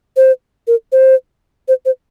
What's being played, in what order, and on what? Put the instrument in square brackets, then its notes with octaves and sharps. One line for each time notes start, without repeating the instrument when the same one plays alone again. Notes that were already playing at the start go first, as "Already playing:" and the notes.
[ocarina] C5
A#4
C5
C5
C5